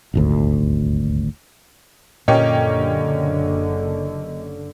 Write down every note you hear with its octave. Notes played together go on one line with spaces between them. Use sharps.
D#1 G#1 D2
F#1 A#2 D3 A#3 C#4 G4 D#5